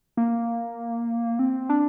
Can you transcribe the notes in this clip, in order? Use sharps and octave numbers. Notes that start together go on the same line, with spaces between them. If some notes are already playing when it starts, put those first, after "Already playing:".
A#3
C4
D4